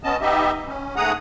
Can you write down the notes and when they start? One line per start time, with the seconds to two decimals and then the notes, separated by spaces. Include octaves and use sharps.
0.04 B3 C#4 D#5 A5
0.21 B3 D#4 G4 D#5 E5
0.67 C#4
0.96 G#2 A3 G#4 F#5 A#5 D#6